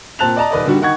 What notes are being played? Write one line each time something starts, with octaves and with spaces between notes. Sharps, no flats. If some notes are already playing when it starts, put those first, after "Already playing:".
A#2 C4 A5 F#6 F7
D5 D#5 A5 A#5
D#1 B4 D5 D#5
D3 D#3 G3 D4 F#4
D#3 D#4 F#5 C#6 G#6